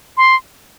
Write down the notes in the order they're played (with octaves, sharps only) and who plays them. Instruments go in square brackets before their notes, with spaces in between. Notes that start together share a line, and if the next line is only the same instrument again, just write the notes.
[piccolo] C6